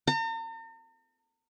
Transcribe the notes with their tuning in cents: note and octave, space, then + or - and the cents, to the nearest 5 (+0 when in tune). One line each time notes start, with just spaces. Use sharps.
A#5 -45